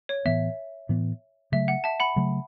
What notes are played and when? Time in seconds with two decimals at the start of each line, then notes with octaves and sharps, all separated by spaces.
0.09 C#5
0.25 A2 E3 B3 E5
0.89 A2 E3 B3
1.52 C#3 F#3 A3 E5
1.68 F#5
1.84 E5 A5
2.00 F#5 B5
2.16 C#3 F#3 A3